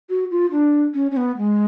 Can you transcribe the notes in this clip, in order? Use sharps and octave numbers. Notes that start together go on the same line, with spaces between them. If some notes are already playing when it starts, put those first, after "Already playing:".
F#4
F4
D4
C#4
C#4
B3
G#3